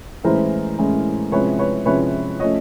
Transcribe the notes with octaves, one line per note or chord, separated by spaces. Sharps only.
A2 E3 G#3 C#4 E4 A#4 C5
A2 E3 G#3 C#4 E4
C3 F3 G#3 C#4 E4 B4 C#5
B4 C#5
C3 F3 G#3 C#4 E4 B4 C#5
F3 A3 C#4 C#5 D#5